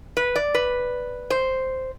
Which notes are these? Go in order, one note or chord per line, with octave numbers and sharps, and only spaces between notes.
B4
D5
B4
C5